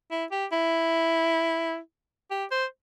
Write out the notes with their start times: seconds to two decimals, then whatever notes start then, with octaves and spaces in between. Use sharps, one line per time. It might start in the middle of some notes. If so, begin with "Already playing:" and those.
0.11 E4
0.31 G4
0.52 E4
2.31 G4
2.51 C5